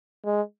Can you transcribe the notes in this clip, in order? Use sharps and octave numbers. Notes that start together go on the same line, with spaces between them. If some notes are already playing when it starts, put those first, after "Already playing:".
G#3